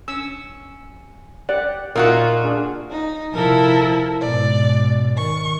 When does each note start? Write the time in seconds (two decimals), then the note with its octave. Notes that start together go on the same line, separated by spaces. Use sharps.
0.08 C#4 E6
1.49 G4 D5 F#5
1.96 A#2 A#3 D#4 F4 F#4 A#4 E5 F#5
2.44 D4 G#4
2.89 D#4
3.32 C3 F3 E4 A4 A#4
4.20 G#2 B2 D5
5.16 D#3 C#6